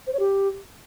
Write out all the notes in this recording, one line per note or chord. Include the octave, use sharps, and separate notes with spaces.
C5
C#5
G4